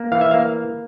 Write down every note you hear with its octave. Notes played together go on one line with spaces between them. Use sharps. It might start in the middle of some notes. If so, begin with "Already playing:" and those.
Already playing: A#3
E3 F5
E5
F5
A#3